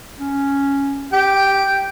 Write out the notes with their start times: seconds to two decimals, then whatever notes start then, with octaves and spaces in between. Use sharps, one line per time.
0.19 C#4
1.13 G4 G5